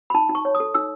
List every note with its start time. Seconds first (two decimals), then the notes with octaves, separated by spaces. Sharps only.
0.10 B5
0.15 D#4 A5
0.29 D#4
0.35 C#6
0.45 C#5
0.55 D#6
0.60 A4
0.74 D#4 E6